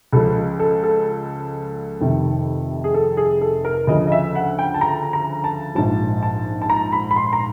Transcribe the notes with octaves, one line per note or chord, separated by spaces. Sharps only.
C#2 C#3 F3 A4
A4
A4
F1 F2 C3 D#3
G#4
A4
G#4
A4
A#4
D2 C#3 F3 D#5
D#5
E5
F#5
G5
A5
A#5
A#5
A5
A#1 G#2 F3 A5
A5
A5
A#5
B5
B5
C6
A#5